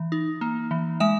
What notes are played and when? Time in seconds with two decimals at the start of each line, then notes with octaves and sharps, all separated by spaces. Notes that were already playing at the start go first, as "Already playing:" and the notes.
Already playing: E3
0.12 D#4
0.41 A#3
0.71 E3
1.00 G#3 E5